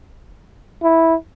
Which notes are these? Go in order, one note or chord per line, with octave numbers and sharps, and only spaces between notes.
E4